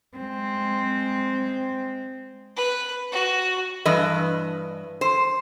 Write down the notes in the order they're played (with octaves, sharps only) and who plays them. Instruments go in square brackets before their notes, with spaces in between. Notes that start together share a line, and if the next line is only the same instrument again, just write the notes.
[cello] G#3 C4
[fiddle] B4
F#4
[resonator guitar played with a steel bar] G2 E3 B4 D#5
C5